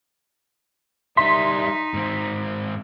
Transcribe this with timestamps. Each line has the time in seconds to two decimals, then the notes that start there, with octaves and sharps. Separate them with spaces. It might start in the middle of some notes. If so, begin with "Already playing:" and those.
1.17 G3 D#4 E5 C6 B6
1.94 G#2 C4